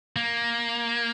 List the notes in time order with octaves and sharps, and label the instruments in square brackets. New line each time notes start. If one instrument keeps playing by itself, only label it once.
[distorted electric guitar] A#3